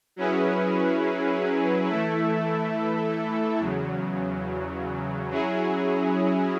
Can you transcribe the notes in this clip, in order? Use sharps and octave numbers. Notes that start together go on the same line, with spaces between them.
F#3 C#4 E4 G#4 B4
E3 A3 E4 A4 E5
E2 C#3 F#3
F#3 C#4 E4 G#4